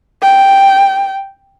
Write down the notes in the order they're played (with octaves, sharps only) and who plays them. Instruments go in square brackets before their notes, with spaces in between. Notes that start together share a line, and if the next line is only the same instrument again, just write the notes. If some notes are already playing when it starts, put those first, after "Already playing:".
[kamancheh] G5